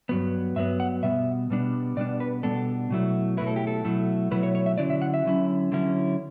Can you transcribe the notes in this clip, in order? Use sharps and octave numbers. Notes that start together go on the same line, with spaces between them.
G2 F#3 B3
G2 F#3 B3 E5
F#5
B2 G3 B3 E5
B2 G3 B3 D4
B2 G3 B3 D4 D5
B4
B2 G3 B3 D4 A4
B2 F#3 A3 E4
B2 F#3 A3 E4 B4
A4
G4
A4
B2 F#3 A3 E4
B2 F#3 A3 E4 B4
C#5
C#5
E5
D3 F#3 C#4 E4 D5
E5
F#5
E5
D3 F#3 C#4 E4
D3 F#3 C#4 E4